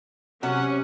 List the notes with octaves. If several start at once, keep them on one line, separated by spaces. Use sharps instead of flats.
C3 F#3 C#4 F#5